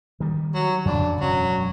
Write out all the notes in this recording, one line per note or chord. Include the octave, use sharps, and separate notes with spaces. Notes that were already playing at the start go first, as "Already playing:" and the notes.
D#3 G3
F#3
F2 C#3 E3 D4
E1 F#2 F#3 C#4